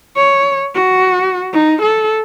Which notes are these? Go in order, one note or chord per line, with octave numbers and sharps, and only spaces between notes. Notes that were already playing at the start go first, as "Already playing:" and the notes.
C#5
F#4
D#4
A4